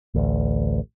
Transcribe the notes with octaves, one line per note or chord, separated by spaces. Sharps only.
A1 D2